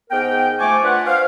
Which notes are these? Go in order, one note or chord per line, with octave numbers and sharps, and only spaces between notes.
G#2 B3 A#4 G5
F3 A3 G#5 A5 C#6 D6
D4 F4 B4 F#5
C5 F5